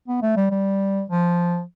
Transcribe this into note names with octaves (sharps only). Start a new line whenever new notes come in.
B3
A3
G3
G3
F3